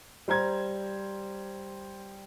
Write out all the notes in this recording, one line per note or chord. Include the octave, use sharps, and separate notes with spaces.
G3 C5 A#5 G#6